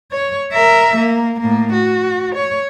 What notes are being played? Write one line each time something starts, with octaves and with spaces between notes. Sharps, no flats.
C#5
A#4 E5
A#3
A2 A#3
F#4
C#5